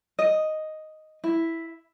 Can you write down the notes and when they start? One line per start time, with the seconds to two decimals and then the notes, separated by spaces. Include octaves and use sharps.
0.19 D#5
1.24 E4